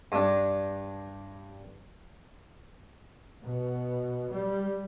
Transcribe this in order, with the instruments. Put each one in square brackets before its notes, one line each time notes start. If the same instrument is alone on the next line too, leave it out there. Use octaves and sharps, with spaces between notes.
[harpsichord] G2 D4
[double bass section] B2
G3